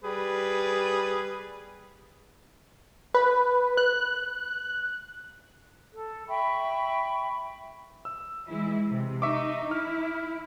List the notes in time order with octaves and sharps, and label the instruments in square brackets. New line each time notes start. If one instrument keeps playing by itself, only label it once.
[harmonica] G3 G#4 B4
[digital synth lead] B4
F#6
[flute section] A4
E5 G5 B5 C#6
[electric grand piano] E6
[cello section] E3 G#3 E4
C3
[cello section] D#4 [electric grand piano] E5 C#6 D6
[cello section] E4 [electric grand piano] F6